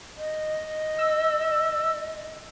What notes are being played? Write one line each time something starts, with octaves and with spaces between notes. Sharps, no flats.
D#5
E6